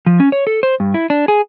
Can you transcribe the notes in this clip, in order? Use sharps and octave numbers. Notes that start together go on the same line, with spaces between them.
F3
C#4
C#5
A4
C5
G2
E4
D4
G#4